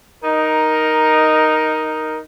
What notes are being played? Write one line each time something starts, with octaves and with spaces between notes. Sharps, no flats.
D#4 A#4